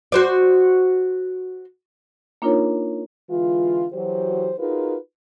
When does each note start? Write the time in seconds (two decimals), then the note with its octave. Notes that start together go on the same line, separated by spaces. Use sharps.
0.12 F#4 C5 D5
2.42 A#3 D4 D#4 F4 A#4 C#5
3.30 D3 E3 G#3 F4
3.93 E3 F#3 F#4 G4 C5
4.59 D#4 F4 F#4 G#4 A#4 B4